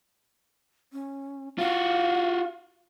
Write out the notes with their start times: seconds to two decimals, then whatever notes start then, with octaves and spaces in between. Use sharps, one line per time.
0.93 C#4
1.58 F4 F#4 F5